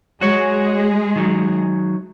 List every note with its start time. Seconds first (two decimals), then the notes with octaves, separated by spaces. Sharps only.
0.21 G#3 F#4 G#4 C#5
1.16 D#3 F#3